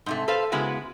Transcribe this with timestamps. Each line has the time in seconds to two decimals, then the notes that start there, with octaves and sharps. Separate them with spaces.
0.06 G#2 C3 A3
0.28 A4 B4 C5 F5
0.52 C#3 G#3 B3 E4 F#4 B4